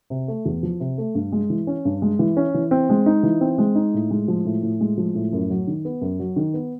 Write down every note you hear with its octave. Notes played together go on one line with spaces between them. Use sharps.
C3
A3
E2
F3
C3
A3
G2
G#3
E3
C#4
G2
G#3
E3
C#4
E3
C4
G#3
D#4
E3
C4
G#3
D#4
A2
G#3
F3
A2
A2
G#3
F3
A2
F#2
F#3
D#3
B3
F#2
F#3
D#3
B3